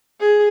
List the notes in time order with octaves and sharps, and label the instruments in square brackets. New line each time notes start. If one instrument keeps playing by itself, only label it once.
[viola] G#4